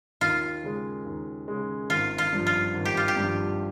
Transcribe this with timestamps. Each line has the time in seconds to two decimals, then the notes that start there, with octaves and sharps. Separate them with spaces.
0.21 D#2 F4
0.64 C#3 G#3
1.05 D#2
1.48 C#3 G#3
1.90 G#1 F4
2.18 F4
2.32 G2 F3
2.47 F4
2.74 G#1
2.85 G4
2.97 F4
3.08 G4
3.17 G2 F3